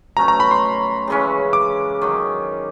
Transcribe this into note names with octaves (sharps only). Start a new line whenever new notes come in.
B2 F#3 A3 C#4 A#5
A#5
B5
C6
C#3 E3 G#3 C#4
D6
D#3 F#3